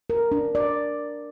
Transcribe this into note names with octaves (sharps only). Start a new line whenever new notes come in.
A#4
D4
D5